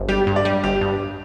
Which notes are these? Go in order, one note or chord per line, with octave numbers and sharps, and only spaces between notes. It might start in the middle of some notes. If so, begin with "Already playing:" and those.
Already playing: G1
G3 G4
G2
D5
G3
G1 G4
G2